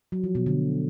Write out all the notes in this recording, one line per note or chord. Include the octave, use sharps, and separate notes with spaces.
F#3
F3
B2
D3